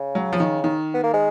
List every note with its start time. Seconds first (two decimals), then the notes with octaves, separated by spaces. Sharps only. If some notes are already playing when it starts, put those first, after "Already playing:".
Already playing: C#3
0.15 F#3
0.33 F3
0.40 D#3
0.64 D#3
0.94 B3
1.04 A#3
1.13 G#3